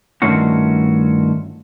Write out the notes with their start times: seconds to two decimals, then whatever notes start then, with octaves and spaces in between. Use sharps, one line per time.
0.22 G2 D#3 A3 C#4 F4 F#4